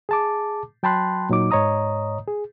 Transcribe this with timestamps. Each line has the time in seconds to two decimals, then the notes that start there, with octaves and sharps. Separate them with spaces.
0.09 G#4 A5 D6
0.83 F#3 G5 A5 B5 C6 F#6
1.29 A#2 F#3 D#4 D6
1.51 G#2 C#5 D#5 A#5 D#6
2.27 G#4